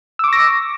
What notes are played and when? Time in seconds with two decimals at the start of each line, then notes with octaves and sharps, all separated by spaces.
0.19 E6
0.24 D6
0.28 C#6
0.33 A#6